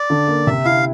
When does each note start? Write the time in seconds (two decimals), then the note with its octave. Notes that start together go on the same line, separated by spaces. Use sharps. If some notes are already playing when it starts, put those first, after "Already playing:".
Already playing: D5
0.10 D3
0.28 A#3
0.47 C3 E5
0.65 E4 F5